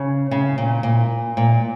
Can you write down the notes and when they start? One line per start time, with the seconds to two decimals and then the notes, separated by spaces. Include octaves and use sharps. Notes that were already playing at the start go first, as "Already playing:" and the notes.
Already playing: C#3
0.31 C#3
0.58 A#2
0.83 A#2
1.37 A#2